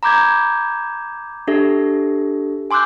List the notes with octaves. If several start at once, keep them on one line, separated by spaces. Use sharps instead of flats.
A#5 B5 D6 G6 G#6
D4 G4 A4 E5
G#5 C6 D6 E6 F#6 G6